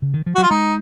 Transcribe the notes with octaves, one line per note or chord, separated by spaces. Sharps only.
C#3
D#3
F3
F#4
F#3 F4
G#3 D#4